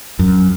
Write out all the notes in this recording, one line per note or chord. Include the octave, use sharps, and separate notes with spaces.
F#2